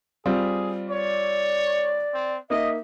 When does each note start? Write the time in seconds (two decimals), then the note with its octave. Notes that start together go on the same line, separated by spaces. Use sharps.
0.26 G3 C4 F4 G#4
0.90 C#5 D5
2.14 C4
2.50 A#3 D#4 D#5 E5